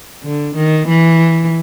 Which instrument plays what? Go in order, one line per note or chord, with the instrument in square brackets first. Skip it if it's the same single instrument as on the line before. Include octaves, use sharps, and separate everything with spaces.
[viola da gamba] D3
D#3
E3